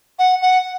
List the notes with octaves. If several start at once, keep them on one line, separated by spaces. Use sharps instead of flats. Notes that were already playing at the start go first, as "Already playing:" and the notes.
F#5
F#5